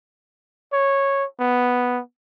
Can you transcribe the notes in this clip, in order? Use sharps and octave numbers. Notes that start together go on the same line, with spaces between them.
C#5
B3